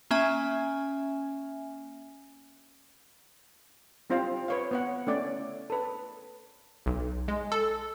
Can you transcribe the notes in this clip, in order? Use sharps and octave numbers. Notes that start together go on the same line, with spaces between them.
A#3 C#4 E5 G#5
G3 C4 F4 C5 F5
B4 C#5 F5
B3 C#5 F#5
A3 C#4 D5
A4 B4
B1
G#3
A4